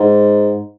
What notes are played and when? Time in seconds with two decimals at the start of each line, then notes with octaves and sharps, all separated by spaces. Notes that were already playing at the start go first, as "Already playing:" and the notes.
Already playing: G#2